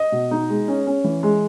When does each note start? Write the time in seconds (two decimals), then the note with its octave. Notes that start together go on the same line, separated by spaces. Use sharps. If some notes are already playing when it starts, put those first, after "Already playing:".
Already playing: D#5
0.12 B2
0.31 D#4
0.49 G#3
0.68 C#4
0.87 C#4
1.04 E3
1.23 G#3